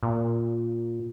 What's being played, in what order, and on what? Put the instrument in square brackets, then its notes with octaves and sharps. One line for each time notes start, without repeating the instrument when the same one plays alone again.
[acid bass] A#2